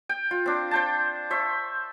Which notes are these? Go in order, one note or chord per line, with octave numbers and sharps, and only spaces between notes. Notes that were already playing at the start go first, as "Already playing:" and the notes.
G5
F4
C4 D4
C5 G5 A5
C5 E5 C#6